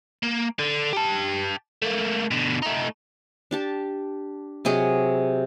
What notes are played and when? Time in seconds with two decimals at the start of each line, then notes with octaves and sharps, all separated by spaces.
0.23 A#3
0.59 D3
0.93 G4 A5
1.82 A3 A#3
2.31 B2 D3
2.62 A3 D#4
3.51 D4 G4 A5
4.65 C3 F#3 G#4 D#5